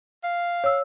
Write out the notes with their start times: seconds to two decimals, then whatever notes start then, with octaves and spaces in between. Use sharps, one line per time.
0.24 F5
0.64 C#5 E6